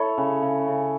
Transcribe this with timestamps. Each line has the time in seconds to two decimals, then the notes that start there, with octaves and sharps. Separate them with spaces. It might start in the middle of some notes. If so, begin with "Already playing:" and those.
Already playing: E4 A4 C#5
0.18 C#3
0.42 C#3
0.67 C#3